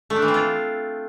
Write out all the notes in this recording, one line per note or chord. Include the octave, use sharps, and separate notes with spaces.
A3
D4
E3
C4
F4